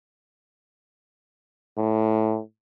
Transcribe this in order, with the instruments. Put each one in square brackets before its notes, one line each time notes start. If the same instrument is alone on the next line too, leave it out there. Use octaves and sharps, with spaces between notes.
[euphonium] A2